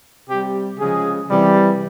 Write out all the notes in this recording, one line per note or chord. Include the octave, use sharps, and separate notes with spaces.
C3 G3 G4
C#3 F3 G#3 G#4
C3 E3 G3